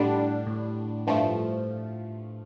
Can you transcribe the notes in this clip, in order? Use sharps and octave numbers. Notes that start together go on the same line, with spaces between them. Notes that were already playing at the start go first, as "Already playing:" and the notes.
Already playing: A2 D3 G3 D4
A2
G2 F3 A3